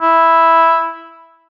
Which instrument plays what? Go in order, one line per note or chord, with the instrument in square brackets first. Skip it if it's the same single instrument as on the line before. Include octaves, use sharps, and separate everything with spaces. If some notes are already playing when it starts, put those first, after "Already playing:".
[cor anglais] E4